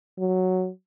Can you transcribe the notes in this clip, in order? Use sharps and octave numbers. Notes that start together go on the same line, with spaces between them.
F#3